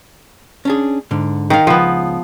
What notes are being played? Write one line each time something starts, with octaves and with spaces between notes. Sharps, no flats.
C#4 D4 G#4
G#2 D3
D#3 F5
C#2 F3 B3